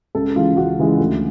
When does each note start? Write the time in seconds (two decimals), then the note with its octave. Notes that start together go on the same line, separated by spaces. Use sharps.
0.15 C#2 A4
0.36 C#3 E3 G#3 F4
0.57 C#2 F#4
0.79 C#3 E3 G#3
1.00 D2